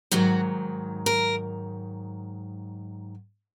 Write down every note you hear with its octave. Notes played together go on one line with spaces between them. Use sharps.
G#2 D#3 F#3 F#4
A#4